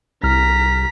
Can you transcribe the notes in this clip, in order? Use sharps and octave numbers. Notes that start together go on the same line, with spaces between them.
C2 A#5 F6 B6